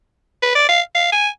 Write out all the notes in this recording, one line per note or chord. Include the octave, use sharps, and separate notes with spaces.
B4
D5
F5
F5
G#5